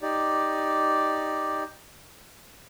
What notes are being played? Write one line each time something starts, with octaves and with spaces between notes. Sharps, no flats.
D#4 G4 D5